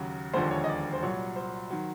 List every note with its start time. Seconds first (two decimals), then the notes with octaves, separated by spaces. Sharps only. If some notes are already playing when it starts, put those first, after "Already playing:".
Already playing: D#2 C#3 F#3
0.34 E1 D#2 D3 F3 C5
0.51 C#5
0.64 D#5
0.68 D5
0.93 C5
1.03 C2 A#2 F#3 C#5
1.36 C5
1.70 D#3 F#3